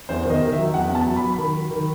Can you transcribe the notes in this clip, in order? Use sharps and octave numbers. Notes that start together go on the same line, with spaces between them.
E2 C5
D#3 D#5
D#3
E5
F#3
E2 F#5
E2
A5
F#3
B5
F#3
B5
D#3
F#3
D#3